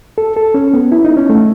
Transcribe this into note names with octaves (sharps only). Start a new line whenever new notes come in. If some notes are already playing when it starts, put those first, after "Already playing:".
A4
A4
C#4
B3
E4
D#4
C#4
A3